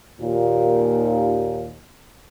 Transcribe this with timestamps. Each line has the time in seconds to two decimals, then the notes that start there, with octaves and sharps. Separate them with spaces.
0.21 D#2 A#2